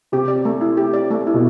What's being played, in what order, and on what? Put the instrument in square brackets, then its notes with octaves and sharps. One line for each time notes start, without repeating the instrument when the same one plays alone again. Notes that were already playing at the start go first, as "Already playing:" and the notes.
[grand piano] C3 [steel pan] G4
[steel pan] D5
A3
E4
G4
D5
A3
E4
[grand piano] B2